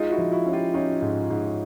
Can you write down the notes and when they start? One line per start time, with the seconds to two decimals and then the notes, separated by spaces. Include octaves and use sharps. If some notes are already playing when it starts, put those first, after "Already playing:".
Already playing: G#3 D#4 F4
0.11 E4 F#4
0.18 F3
0.32 E4 F#4
0.46 C#4
0.53 F4 G4
0.74 C#4 D#4 F4
1.02 G#2
1.30 G#2